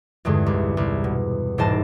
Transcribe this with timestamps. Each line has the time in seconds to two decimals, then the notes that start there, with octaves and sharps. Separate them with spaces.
0.25 E2 G2 D3 G#3
0.46 C2
0.77 C2
1.04 B2
1.58 E1 C2 G#2 C5 D#5 A5